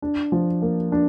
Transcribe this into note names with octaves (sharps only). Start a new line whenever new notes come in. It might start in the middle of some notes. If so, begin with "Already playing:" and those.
D4
F3
A#3
D4